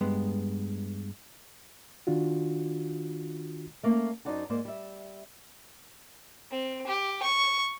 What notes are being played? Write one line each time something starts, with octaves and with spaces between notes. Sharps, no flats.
G2 G#3 B3
D#3 D4 F4 F#4
A3 A#3 C#4 F5
F#2 D#4 C5 D5 F#5 A5
G#2 A#3 C5 D5
G3 E5
C4
G4
C#6